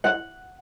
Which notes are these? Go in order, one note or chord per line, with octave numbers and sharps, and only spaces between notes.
F#5